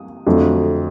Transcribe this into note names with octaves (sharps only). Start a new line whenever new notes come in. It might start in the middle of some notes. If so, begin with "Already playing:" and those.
Already playing: D#6
F2 D3 F#3 A3